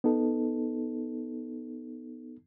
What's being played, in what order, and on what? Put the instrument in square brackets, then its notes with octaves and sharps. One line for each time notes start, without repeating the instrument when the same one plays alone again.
[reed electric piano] B3 D#4 A4